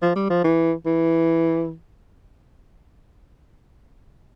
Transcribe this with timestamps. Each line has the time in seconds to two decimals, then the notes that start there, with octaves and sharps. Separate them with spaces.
0.02 F3
0.16 G3
0.30 F3
0.44 E3
0.86 E3